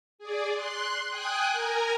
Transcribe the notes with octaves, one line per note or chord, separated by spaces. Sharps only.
G#4 D5
C6 F#6
G5 G#5 D#6 F#6
A#4 G#5 A#5